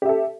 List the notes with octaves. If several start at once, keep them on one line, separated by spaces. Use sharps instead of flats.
G4 A4 E5